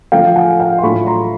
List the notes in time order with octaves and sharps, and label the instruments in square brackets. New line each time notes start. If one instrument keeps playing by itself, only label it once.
[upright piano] D3 F3 A3 F5 G5
F#5 G#5
F5 G5
C6
A2 F#3 A3 D4 F4 B5 C#6
A#5 C6